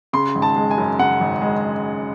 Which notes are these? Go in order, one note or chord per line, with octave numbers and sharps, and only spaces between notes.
C#3 C6
G#1
A5
G#3
G#5
F#2
C#3 F#5
G#1
G#3